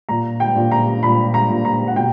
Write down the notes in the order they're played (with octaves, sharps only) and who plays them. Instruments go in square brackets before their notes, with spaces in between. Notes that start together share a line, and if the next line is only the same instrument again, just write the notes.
[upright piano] A#2 A#5
G5
A#2
A#5
A#2 B5
A#5
A#2
A#5
F#5
B2 G5